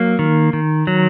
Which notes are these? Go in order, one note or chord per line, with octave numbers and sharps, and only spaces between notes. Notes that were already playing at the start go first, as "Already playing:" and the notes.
Already playing: F#3 A#3
D#3
D#3
F#3